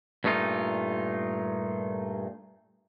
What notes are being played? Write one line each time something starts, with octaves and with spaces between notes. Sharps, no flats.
G2 A#2 A3 D#4 F4